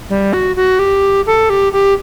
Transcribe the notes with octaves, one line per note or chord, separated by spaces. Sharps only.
G3
F#4
F#4
G4
A4
G4
G4